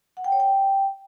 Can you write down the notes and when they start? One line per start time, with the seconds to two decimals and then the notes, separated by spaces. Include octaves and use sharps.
0.17 F#5
0.24 G5
0.32 C#5
0.40 G5